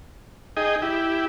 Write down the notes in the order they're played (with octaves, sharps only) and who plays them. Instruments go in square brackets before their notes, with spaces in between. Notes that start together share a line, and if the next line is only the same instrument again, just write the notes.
[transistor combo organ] D#4 G#4 D#5 G5
E4 G4